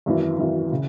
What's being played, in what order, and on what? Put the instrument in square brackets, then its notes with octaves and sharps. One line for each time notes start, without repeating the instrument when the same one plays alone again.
[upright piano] G#1 F#2 E3
G#1 F#2 E3
C#3